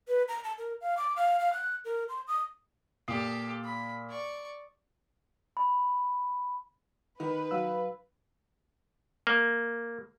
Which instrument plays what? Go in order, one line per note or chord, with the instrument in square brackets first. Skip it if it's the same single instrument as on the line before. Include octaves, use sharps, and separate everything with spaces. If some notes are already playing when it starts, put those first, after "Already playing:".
[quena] B4
A#5
A5
A#4
F5
D6
F5
F5
F#6
A#4
C6
D#6
[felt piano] A#2 D#6 C7 [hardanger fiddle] G4 A4
[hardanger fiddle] B5
D5 C#6
[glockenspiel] B5
[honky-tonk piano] D#3 [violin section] B4
[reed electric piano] F#3 F5 E6
[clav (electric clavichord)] A#3